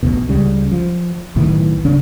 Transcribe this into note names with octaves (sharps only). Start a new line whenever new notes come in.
A1 E2 B2
C#2 C#3 G3
F3
B1 A2 D#3 E3
C#3 C#4 D4